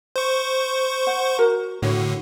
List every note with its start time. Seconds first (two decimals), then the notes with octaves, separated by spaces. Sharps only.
0.16 C5 C#6
1.07 F#5
1.38 F#4 A#4 A#5
1.82 A2 D3 F#4 C#5